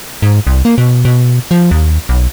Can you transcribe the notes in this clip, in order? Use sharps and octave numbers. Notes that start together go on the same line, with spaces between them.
G#2
C2
A#3
B2
B2
F3
D#2
B1